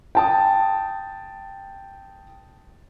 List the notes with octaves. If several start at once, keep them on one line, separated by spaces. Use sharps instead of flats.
G5 A5 D#6